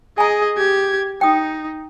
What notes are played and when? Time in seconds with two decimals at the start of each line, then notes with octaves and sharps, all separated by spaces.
0.18 G#4 D#5 G#5 A#5
0.57 G4 G#6
1.21 D#4 G5 D#6